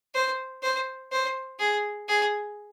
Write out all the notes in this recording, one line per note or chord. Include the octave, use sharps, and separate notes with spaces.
C5
C5
C5
G#4
G#4